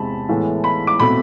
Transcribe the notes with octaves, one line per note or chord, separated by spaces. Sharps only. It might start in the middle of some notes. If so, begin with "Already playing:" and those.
Already playing: E2 C3 G#3 C4 A5 B5
A2 E3 G#3 B3
B5
D6
B2 A3 C4 B5